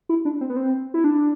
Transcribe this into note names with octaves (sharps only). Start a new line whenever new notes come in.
E4
D4
C4
B3
C4
E4
D4